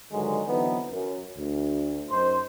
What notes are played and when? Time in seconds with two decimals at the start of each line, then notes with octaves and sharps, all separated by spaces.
0.12 G2 D3 D#3 F#3 G#3
0.47 D3 E3 F#3 B3 C4 D#4
0.89 F#2
1.37 D2
2.10 F#2 D#4 C5